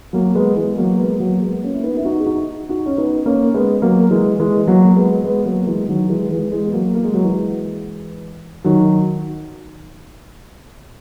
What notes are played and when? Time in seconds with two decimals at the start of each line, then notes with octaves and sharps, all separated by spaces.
0.13 F#3 A#3
0.35 G#3 B3
0.56 E3 G#3
0.78 F#3 A#3
0.98 G#3 B3
1.20 F#3 A#3
1.42 G#3 B3
1.63 A#3 C#4
1.74 E4
1.84 B3 D#4
1.97 E4
2.05 D#4 F#4
2.20 G#4
2.26 D#4 F#4
2.69 D#4 F#4
2.86 C#4
2.98 B3 D#4
3.26 A#3 C#4
3.54 G#3 B3
3.82 F#3 A#3
4.11 E3 G#3
4.40 E3 G#3
4.67 F#3 A#3
4.96 G#3 B3
5.24 G#3 B3
5.45 F#3 A#3
5.67 E3 G#3
5.89 D#3 F#3
6.09 E3 G#3
6.31 E3 G#3
6.52 E3 G#3
6.64 B3
6.73 F#3 A#3
6.95 A#3
7.04 G#3
7.14 F#3
7.24 E3 G#3
8.65 D#3 F#3